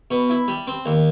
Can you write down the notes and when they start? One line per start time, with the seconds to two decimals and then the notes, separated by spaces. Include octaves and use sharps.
0.11 B2
0.30 E4
0.48 G3
0.67 C4
0.86 D#2